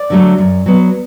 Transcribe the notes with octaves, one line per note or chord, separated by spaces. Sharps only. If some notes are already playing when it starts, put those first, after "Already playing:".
Already playing: D5
D3 F#3 A3
F#2
F#3 B3